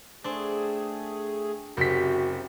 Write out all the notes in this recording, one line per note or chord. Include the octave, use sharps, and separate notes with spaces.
A3 C4 D4 G#4
F#1 C3 F#4 G4 B6